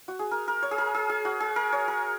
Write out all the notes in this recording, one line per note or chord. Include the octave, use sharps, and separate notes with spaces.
F#4
G#4
A#4
A#4
C#5
G#4
A#4
G#4
G#4
F#4
G#4
A#4
C#5
A#4